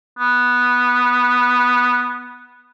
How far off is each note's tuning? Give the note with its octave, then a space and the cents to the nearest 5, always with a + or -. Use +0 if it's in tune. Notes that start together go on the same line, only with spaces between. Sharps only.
B3 -5